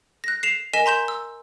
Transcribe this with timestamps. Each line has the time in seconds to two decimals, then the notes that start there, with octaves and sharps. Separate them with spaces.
0.24 F#6 A#6
0.43 C7 E7 F7
0.73 A#4 D#5 G#5 B6 D#7 E7
0.86 A#5 C6 G6 E7
1.08 E6